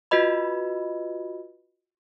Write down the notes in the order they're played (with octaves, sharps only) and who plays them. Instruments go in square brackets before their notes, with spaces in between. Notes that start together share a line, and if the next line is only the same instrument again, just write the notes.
[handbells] F4 F#4 B4 D#5 B5